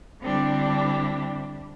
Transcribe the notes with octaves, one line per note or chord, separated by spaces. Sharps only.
D3 G3 C4 D4 E4 G4